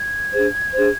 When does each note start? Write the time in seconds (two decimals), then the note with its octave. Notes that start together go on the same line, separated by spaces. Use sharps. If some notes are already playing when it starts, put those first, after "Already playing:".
Already playing: G#6
0.32 D4 G#4 C5
0.73 D4 G#4 C5